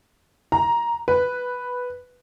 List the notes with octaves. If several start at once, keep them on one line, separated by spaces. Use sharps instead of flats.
A#5
B4